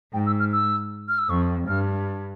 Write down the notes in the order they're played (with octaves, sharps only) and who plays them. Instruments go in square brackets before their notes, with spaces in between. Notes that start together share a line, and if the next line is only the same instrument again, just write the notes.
[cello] G#2 [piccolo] G5
[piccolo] E6
F6
E6
F6
E6
[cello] F2 [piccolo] C#6
[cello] G2 [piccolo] F6